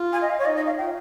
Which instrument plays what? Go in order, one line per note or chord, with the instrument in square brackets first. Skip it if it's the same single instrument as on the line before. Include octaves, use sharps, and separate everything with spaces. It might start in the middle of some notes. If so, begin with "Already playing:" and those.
Already playing: [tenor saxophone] F4
[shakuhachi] G#5
D#5
F5
C#5
[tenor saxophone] D#4 [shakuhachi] D#5
[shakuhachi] D#5
F5
[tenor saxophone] F4 [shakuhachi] G5